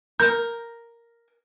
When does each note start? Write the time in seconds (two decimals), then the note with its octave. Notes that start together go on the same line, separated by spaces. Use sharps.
0.20 A#4 G6